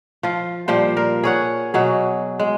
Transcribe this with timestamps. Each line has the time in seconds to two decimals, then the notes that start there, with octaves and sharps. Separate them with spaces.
0.23 F3 F4
0.68 A#2 F3 G3 C5
0.97 A#4
1.23 G#4 C#5 F#5
1.74 B2 F#3 G#4
2.39 G#3